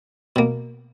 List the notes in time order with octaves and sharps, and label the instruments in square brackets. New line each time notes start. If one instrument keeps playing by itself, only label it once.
[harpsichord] B2 A#3